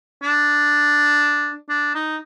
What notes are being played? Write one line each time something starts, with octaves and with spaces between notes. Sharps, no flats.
D4
D4
D#4